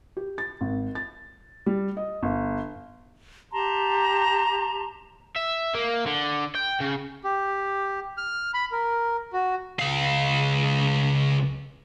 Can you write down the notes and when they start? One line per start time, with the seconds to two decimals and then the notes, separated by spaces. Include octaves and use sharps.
0.17 G4
0.38 A6
0.61 G#1
0.95 A6
1.66 G3
1.97 D#5
2.23 G1
3.53 G4 A5 A#5 C6
5.36 E5
5.75 A#3
6.07 D3
6.55 G5
6.80 C#3
7.24 G4
8.18 F6
8.54 B5
8.72 A#4
9.33 F#4
9.79 C#2 F5